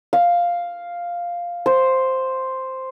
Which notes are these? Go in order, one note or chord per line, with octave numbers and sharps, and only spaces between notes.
F5
C5